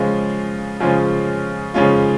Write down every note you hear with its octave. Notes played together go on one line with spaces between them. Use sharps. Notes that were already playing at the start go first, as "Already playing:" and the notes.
Already playing: C#3 F3 G#3 C#4 F4
C#3 F3 G#3 C#4 F4
C#3 F3 G#3 C#4 F4